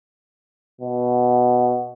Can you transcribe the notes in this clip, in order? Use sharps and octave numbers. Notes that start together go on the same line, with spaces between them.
B2